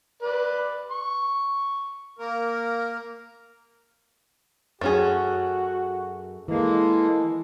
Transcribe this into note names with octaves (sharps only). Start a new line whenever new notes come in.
B4 D5
C#6
A#3 A#4
F#2 A3 C#4 F#4 G#4
E3 G#3 A#3 A4